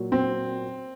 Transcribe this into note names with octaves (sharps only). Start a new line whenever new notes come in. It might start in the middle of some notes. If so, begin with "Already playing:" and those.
Already playing: A#2 F#3
C4